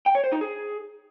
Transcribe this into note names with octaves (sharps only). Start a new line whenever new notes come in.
G5
C#5
C5
D#4
G#4